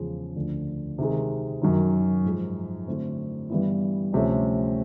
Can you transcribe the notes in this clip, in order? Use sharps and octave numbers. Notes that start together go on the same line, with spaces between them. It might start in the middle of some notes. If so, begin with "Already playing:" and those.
Already playing: E2 C#3 F3 G#3
D2 D3 F3
C3 D#3 G#3
F#2 D#3 F#3
G#2 F3 G#3
D3 F#3 A3 C4 E4
G2 E3 G3 B3 E4
D2 C3 F3 A3 C#4